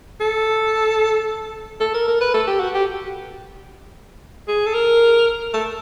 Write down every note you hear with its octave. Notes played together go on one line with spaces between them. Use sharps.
A4
A4
A#4
A#4
B4
A4
G4
F#4
G4
G#4
A4
A#4
A4